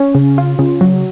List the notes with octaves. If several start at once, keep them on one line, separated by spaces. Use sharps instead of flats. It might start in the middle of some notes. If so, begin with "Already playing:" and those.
Already playing: C#4
C#3
F4
C#3
F#3